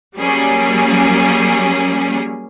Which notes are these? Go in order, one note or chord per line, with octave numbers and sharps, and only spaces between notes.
F#3 G3 A#3 C#4 G#4